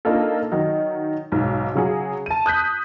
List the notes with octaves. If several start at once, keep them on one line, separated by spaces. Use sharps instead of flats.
A#3 D4 D#4 F4 A4
D#3 F#3 D#4
B1 G#2
C#3 F#3 G#4
A5 D#7
D#6 F#6 G6 B6